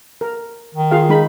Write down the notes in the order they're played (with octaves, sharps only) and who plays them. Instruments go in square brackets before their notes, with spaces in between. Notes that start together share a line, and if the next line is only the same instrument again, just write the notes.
[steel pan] A#4
[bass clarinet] D#3
[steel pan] F4 G#4 F5
G#3 D#4 B5